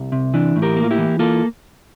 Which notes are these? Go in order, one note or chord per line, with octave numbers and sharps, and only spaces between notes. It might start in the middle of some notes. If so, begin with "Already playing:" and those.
Already playing: C2
C3
E3 D4
A2
G4 A#4
A#3
F4
E4 G4
E3
A#3 F4 A4